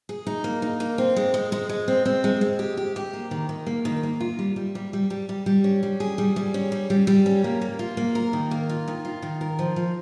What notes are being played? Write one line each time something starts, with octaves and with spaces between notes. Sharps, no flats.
G#4
D#4
A#3
D#4
A#3
C4
G#3
G#3
G#3
G#3
C4
C4
G#3
G#3
G4
G4
G4
A#3
D#3
D#3
A#3
D#3
A#3
F4
G3
G3
G3
G3
G3
G3
G3
C#4
G3
G#4
G3
G3
C#4
G3
G3
G3
C#4
A#3
A#3
F4
A#3
A#4
D#3
A#3
F4
D#3
F4
D#3
A#4
F3
F3